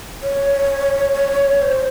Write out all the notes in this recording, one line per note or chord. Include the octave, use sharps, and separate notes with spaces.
C#5
C5